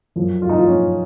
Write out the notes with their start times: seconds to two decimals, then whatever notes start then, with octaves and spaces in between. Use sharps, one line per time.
0.16 F#2 F3
0.42 F4
0.49 D#4
0.58 F3 F4
0.68 C#4